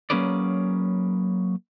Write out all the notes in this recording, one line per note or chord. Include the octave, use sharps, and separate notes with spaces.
F#3 A#3 C#4 G#4 B4 D5